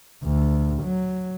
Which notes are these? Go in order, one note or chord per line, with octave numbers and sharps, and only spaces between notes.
D2
F#3